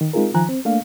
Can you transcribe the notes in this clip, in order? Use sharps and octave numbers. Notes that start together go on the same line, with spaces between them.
D#3
G#3 C4 D#4 F4 G#4 A#4
D#3 F3 G#5 A#5 F#6
C4
A3 A#3 D4 F5